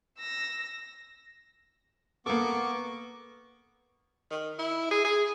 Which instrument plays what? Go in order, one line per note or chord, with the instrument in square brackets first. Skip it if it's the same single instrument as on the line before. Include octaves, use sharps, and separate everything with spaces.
[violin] E6 A#6
[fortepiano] A#3 A4 [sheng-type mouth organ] B3 C#6 D6
[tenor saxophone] D#3
E4
G#4
G#4